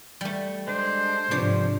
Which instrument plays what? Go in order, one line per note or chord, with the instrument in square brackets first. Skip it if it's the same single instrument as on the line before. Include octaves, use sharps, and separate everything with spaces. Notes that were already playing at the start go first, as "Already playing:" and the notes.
[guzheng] G3 A3
[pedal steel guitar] G#3 D4 [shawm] C5
[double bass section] G#2 C3 [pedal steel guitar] F3 [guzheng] D4 C#5